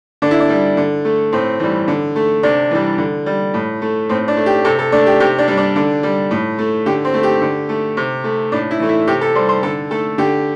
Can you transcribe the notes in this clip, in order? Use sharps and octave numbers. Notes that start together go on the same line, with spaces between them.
D3 D4
E4
D4
G3
D3
A3
A2 C4
E3 G3
D3
A3
C3 D4
E3 G3
D3
G3
A2
A3
A2 C4
D4
A3
G4
C3 A4
A4
A3 D4
G4
C3 G4
D4
G3
D4
D3
G3
A2
A3
D3 G4
C4
A3
G4
D3
A3
C3
A3
A2 D4
E4
E3 A3
E4
C3 G4
A4
G3 C5
C5
D3 A4
A3 A4
D3 G4